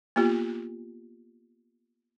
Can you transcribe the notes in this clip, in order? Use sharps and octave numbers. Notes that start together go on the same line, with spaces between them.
A#3 B3 F4 G4